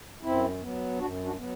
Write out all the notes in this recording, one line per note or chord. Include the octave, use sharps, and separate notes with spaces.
F#2 C4 E4
F#3 B3
F#2 D4 F#4
D4 F#4
F#3 B3